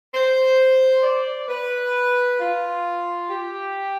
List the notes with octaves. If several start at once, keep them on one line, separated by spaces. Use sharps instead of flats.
C5
D5
B4
F4
G4